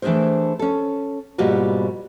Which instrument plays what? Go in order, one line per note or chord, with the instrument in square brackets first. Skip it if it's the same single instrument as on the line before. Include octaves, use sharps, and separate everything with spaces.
[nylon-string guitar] E3 A3 D4 G#4 A#4 C5
C#4 A4
G#2 B2 G3 A#3 F4 F#4